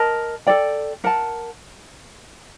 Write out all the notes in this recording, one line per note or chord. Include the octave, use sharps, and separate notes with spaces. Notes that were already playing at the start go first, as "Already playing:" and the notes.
Already playing: A#4 D#5 A5
A4 D5 G5
A#4 F#5 A5